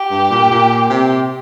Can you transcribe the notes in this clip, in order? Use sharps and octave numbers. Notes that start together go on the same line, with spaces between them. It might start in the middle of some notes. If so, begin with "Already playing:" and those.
Already playing: G4
G2
A#2
A#2
C3